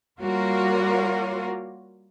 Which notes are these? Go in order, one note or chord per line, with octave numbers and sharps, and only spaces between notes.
G3 A#3 F4 F#4 A#4 C#5